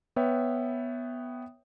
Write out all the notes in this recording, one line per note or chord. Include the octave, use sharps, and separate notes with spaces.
B3 B4 C#5 E5 G5